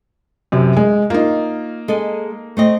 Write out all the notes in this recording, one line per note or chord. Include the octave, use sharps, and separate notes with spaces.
F#2 C3
G#3
A#3 D#4 F4
G#3 A4 D#5
A3 C4 D#5